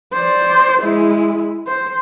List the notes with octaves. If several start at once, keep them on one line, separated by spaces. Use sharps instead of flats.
C5 D5
G#3 E4
C5